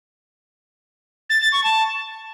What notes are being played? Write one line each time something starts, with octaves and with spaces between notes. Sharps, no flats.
A6
A6
C#6
A5